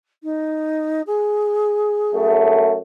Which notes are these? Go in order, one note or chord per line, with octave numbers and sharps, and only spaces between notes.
D#4
G#4
F#2 A3